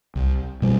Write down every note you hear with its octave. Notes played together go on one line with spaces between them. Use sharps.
C2
B2 G3